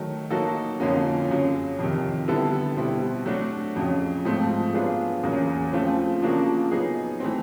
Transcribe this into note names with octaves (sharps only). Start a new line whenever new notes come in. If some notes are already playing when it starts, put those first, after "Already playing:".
Already playing: D#3 F#3 A3
F#3 A#3 D#4 F#4 A4
F2 D3 F3 A#3 C#4
F#2 C#3 F#3
F2 C3 D#3
D3 G3 B3 E4 A4
B2 G3 C4 E4
F#3 A3 D4 F#4
F2 C#3 F#3
G#2 F3 A3 C4
F#3 B3 D4 F4 G#4
E2 C#3 F#3 A#3
C#3 F3 A3 C4 F4
C#3 F3 A#3 D4 F#4
F#3 B3 D#4 G#4
E3 A3 C4